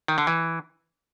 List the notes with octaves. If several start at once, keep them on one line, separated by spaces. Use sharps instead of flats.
D#3
D3
E3